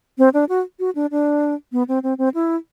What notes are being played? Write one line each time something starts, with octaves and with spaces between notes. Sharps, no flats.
C4
D4
F#4
F#4
D4
D4
B3
C4
C4
C4
E4